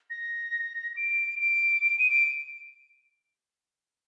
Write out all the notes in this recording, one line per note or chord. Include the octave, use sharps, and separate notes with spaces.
A#6
D7
D7
D7
D#7
D7